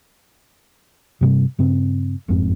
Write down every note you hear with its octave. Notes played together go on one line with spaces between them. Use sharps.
G2 C3 G3
G2 C#3 C4
F#1 F2 G#2 C4